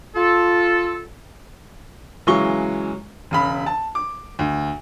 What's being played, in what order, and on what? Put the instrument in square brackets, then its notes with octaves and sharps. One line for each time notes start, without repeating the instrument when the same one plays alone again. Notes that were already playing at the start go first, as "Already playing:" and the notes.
[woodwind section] F4 A4
[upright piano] C#3 E3 F#3 G#3 C#6 G7
E1 C#3 B5
A5
D6
D2